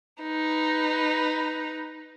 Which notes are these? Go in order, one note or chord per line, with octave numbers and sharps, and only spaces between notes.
D#4 B4